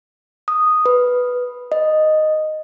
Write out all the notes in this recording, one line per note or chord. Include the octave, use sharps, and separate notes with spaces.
D#6
B4
D#5